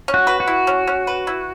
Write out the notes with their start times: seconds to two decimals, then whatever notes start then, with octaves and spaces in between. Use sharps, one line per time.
0.08 C#4
0.14 F#4
0.27 B4
0.40 F#4
0.47 E4
0.67 C#4
0.87 C#4
1.07 B4
1.27 E4